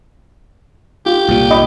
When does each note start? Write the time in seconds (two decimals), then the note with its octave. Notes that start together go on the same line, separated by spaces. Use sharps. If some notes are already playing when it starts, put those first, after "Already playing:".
1.06 F4 G4
1.29 C2 A#2
1.51 D#5 B5 D#6